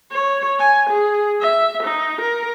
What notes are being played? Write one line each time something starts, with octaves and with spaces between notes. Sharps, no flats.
C#5
G#5
G#4
E5
D#4
A#4